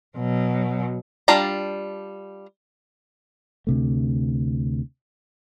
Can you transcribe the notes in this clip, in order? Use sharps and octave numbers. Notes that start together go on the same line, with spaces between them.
B2 F#3
G3 D4 F4 A5 A#5
D2 C3 A3